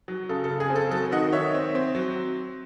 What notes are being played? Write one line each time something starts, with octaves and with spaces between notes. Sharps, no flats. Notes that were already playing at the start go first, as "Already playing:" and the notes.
F#3
C#3 A4
A4
C#3
G#4
C4
A4
F#3 A4
D#3 D#5 F#5
D#3 C#5 E5
C4
C4
F#3